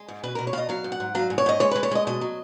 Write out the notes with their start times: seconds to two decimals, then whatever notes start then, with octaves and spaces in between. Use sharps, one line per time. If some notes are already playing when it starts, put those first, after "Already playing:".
Already playing: G#3
0.08 G#2
0.23 B2 B4
0.35 B2 A#4
0.47 C#5
0.53 B2 D#5 F5
0.69 F#3 F5
0.84 G#2
0.92 F#5
1.00 G#2
1.15 F#3 F5
1.30 G#2
1.38 C#5
1.46 G#2 D#5
1.60 G#3 C#5
1.71 G#3 B4
1.83 C#5
1.91 G#3 D#5
2.07 B2 D#5
2.21 F#3